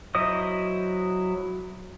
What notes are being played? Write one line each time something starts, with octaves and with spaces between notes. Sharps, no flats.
F#3 E4 C5 D#5 D#6